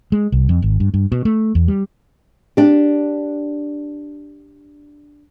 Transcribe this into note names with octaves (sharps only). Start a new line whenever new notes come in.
G#3
C2
F2
G#1
G2
G2
B2
A3
E2
G3
D4 G4